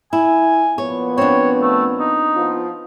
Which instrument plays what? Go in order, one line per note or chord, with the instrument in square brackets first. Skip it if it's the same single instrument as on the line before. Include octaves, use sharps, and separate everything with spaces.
[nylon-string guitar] E4 [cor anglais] G#5
[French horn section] A#2 F3 B3 [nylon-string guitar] C#5
[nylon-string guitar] C4 D4 [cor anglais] C#5
[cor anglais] A3
D#4
[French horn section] F3 B3 F4